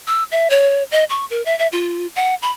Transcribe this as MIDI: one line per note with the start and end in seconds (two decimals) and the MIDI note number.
0.07 0.24 88
0.32 0.48 76
0.50 0.83 73
0.92 1.04 75
1.10 1.25 85
1.30 1.44 70
1.46 1.57 76
1.59 1.67 76
1.72 2.07 65
2.16 2.35 78
2.42 2.51 83